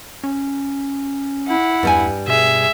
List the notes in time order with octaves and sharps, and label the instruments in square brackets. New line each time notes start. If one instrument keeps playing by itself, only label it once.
[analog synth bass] C#4
[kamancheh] E4 F#5
[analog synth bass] E2 [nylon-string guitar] G2 G3 G#5
[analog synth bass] B2 [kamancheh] G#4 [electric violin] E5